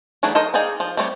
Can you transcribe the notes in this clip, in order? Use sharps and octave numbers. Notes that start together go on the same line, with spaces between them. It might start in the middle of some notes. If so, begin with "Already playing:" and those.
E3 F#3 A3 D4 G#4
A4 A#4 C5 D#5
D#4 G#4 D5 F5 G5
F3
G3 A3 C4 C#5 D5